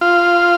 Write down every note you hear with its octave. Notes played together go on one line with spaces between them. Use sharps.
F4